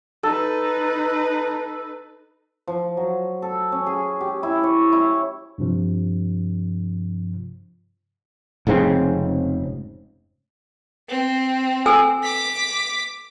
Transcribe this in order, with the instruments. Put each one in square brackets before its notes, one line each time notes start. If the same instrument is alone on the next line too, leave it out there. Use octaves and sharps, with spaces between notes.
[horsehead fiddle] D#4 B4 [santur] A4
[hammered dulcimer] F3
F#3
A4
C#4
G#4
G4
E4
C#5
E4
[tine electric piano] G2 C3 F3
[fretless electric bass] F1 G#2 C#3 C4
[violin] C4
[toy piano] A4 G#5 E6
[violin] D6 B6